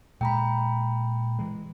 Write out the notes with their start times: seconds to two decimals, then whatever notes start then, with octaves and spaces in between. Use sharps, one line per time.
0.21 A#2 G#3 G5 A#5 B5
1.39 E3 G#3